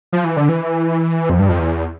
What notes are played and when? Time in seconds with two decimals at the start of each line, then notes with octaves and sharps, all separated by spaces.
0.12 F3
0.24 E3
0.37 D3
0.49 E3
1.30 F2
1.39 G2
1.49 F2
1.59 E2